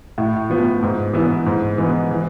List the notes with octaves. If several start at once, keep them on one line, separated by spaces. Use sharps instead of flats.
A2
F3 B3
G#2
E3 B3 E4
G#2
E3 G#3 B3
E3